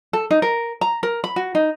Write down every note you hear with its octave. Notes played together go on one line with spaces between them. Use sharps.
A4
D#4
A#4
A#5
A#4
B5
F#4
D#4